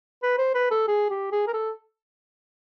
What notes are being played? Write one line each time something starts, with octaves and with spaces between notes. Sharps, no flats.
B4
C5
B4
A4
G#4
G4
G#4
A#4
A4